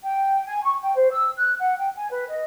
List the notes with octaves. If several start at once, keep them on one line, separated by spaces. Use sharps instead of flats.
G5
G#5
C#6
G5
C5
E6
F#6
F#5
G5
G#5
B4
D#5